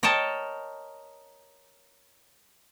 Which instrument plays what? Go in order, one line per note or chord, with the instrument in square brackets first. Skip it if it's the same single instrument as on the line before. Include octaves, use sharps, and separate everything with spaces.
[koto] A#4 C#5 D#5 G5 A5